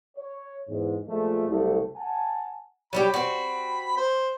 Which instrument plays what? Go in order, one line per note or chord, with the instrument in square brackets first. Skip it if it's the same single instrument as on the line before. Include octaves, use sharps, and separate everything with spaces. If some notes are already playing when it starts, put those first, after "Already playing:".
[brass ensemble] C#5
E2 G#2
A#2 F3 G#3 A3
F#1 C2 A3
F#5 G#5 A5
[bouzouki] F#3 G3 G4 [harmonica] B5
[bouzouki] C4 F#4
[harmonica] C5